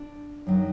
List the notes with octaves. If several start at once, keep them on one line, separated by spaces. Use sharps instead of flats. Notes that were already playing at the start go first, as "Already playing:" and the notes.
Already playing: D4
F#2 D#3 F#3